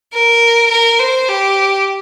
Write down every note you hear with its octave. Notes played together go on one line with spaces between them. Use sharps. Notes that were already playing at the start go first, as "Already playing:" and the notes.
A#4
A#4
C5
G4